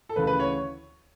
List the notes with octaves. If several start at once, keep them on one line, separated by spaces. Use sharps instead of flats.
A4
D2 C#3 E3 B4
B4
C#5